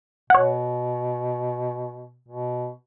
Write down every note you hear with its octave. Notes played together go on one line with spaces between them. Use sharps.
B2 C#5 F#5
B2